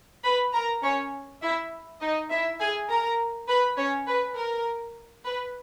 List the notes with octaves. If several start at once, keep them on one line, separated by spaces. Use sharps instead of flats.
B4 B5
A#4 A#5
C#4 C#5
E4 E5
D#4 D#5
E4 E5
G#4 G#5
A#4 A#5
B4 B5
C#4 C#5
B4
A#4
B4